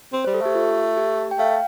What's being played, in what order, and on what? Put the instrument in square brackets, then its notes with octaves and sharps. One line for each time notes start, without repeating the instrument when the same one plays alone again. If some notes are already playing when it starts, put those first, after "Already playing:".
[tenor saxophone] C4
[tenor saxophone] G3 [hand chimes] C5
[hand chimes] A4
[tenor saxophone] A3 [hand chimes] G4
[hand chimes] F4
G4
G5
[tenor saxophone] A3 [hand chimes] F5